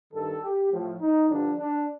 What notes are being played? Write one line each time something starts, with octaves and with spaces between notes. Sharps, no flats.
G2 D#3 A4
G4
A2 F3
D#4
G2 D3 F3 D4
D4